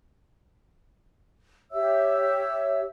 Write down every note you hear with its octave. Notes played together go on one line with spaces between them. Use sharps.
G4 C#5 E5 E6